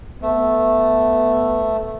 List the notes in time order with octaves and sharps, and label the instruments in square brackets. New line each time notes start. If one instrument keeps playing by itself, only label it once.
[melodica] A3 [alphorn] B3